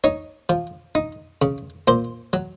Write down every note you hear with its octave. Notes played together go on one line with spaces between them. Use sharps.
D#4 C#5
F3
D#4
C#3
A#2 C5
F#3